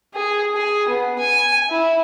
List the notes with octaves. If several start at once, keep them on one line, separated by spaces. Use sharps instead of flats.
G#4
G#4
B3
G#5
E4